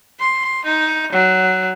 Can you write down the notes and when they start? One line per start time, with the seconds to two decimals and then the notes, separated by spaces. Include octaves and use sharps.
0.19 C6
0.65 D#4
1.12 F#3